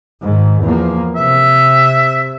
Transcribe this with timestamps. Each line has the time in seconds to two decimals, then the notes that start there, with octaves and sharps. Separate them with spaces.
0.22 G#2 D#3
0.61 E2 F3 A#3
1.16 C3 E5